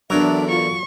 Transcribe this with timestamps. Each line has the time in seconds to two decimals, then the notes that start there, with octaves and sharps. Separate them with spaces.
0.10 E2 D3 F#3 D4 A#4 E5
0.49 F4 C#6